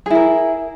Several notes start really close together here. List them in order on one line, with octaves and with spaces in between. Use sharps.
G#4 E4 A#4